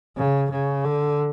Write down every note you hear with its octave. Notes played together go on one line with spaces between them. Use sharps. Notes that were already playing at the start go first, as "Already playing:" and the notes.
C#3
C#3
D3